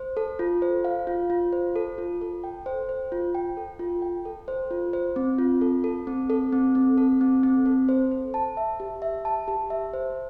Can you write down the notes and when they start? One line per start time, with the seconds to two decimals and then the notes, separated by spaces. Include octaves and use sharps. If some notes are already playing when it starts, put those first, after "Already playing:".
Already playing: C5
0.17 A4
0.39 F4
0.62 C5
0.84 F5
1.07 F4
1.30 F4
1.53 C5
1.76 A4
1.98 F4
2.21 A4
2.44 G5
2.66 C5
2.89 C5
3.12 F4
3.35 G5
3.57 A4
3.79 F4
4.02 G5
4.25 A4
4.48 C5
4.71 F4
4.93 C5
5.16 C4
5.38 F4
5.61 A4
5.84 A4
6.07 C4
6.30 A4
6.53 C4
6.75 C4
6.98 A4
7.21 C4
7.43 C4
7.66 A4
7.89 C5
8.12 C5
8.34 A5
8.57 E5
8.80 G4
9.02 E5
9.25 A5
9.48 G4
9.70 E5
9.93 C5